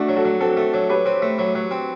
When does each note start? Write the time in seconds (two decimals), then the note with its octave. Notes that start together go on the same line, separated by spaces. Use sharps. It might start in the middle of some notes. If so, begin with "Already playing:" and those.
Already playing: A3 D4 F#4
0.08 F#3
0.16 F#4 A4
0.25 F#3
0.40 C4 F#4 A4
0.57 A3
0.74 F#3
0.89 F#3 G4 B4
1.06 C4
1.22 A3
1.38 F#3
1.55 F#3
1.71 C4